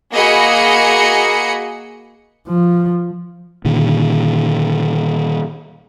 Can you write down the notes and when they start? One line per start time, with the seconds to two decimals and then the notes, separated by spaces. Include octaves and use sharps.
0.13 A#3 F#4 G#4 D#5 B5 C#7
2.47 F3
3.65 A#2 D3 D#3